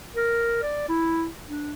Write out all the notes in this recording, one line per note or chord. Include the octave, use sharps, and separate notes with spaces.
A#4
D5
E4
D4